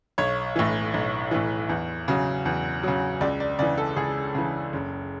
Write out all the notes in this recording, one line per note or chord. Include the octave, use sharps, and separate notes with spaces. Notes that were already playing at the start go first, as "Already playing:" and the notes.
B1 C#5
A2 E3
B1
A2 E3
E2
C#3 F#3
E2
C#3 F#3
C#2 D5
D5
C#3 E3 D5
A4
C#2 G#4
C#3 E3
F#1